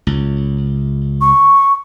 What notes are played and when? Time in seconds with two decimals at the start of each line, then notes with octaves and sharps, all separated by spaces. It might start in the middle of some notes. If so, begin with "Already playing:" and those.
0.07 C#2
1.21 C#6